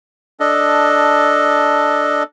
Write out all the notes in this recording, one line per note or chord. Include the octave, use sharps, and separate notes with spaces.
D4 A4 D#5